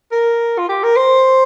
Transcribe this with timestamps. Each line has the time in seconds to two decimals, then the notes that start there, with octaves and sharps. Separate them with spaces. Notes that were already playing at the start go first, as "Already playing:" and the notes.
0.12 A#4
0.58 F4
0.69 G4
0.83 A#4
0.97 C5